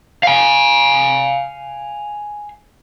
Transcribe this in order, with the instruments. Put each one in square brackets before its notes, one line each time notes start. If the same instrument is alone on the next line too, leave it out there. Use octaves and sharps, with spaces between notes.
[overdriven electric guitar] F5 G#5